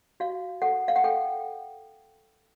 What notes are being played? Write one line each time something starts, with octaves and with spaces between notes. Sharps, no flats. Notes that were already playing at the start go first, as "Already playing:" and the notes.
F#4 F5
A4 F#5
F5
F#5
A4 G5